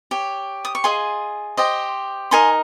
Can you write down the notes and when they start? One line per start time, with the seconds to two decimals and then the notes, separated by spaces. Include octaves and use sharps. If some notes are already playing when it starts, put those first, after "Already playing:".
0.11 G4 C#5
0.65 D#6
0.75 C#6
0.84 F4 G#4 D#5 G#5 C6
1.57 G4 C5 D#5
2.31 D#4 A#4 D#5 G#5 C6